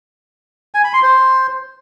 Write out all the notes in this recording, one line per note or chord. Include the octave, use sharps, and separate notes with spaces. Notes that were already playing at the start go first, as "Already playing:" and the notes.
G#5
B5
C6
C5